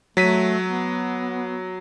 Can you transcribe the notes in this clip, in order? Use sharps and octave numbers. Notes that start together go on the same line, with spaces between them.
F#3 A3 B6 D#7
B3